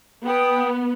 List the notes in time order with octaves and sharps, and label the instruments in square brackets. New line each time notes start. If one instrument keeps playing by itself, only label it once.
[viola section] B3 [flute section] G5 D#6